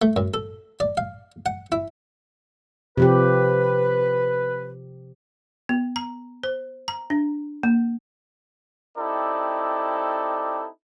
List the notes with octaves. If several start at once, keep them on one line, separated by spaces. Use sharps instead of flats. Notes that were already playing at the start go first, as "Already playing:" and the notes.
A3
F#2
A4
D5
F5
F#5
E4
C3 F3 G4 B4
B3
A#5
C5
A#5
D4
A#3
C4 D#4 E4 G4 A4 D5